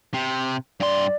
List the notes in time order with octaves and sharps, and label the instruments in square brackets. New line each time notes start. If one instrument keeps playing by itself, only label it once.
[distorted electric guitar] C3
[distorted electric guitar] G2 C6 [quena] D5